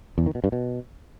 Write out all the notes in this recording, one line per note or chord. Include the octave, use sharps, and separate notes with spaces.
E2
D#3
B2
G2
B2